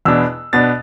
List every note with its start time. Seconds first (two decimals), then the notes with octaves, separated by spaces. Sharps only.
0.05 E2 B2 B3 D4 E6
0.53 B2 B3 D4 A6